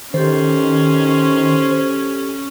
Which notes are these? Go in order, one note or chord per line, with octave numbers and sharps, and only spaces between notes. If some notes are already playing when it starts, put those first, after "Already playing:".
D#3 C#4 G4 A4 C5